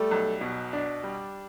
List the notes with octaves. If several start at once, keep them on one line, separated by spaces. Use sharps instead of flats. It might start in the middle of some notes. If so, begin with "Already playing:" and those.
Already playing: G3 A3
B1
B2
D4
G3